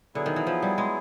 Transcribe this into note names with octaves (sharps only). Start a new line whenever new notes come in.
D3 F#3 B3 E4 G#4
D#3
E3
F3
G3
G#3